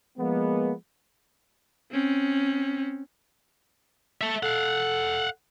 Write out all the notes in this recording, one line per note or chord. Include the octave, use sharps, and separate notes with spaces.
F3 G#3 A#3 B3
C4 C#4
A4 E5
A4 F5 F#5